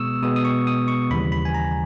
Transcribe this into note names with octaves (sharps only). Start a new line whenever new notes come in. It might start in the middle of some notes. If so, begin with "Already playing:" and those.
Already playing: B2 G#3 B3 C#6 D#6 E6
B2 G#3 B3 D#6
D#6
C#6
D#6
C#6
D#2 C#3 E3 G3 B5
B5
G#5
A#5